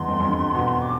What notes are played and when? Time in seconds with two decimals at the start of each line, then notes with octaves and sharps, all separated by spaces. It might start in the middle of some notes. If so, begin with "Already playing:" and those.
Already playing: E2 C6
0.08 F2
0.20 F2
0.28 G2
0.55 B2
0.81 D6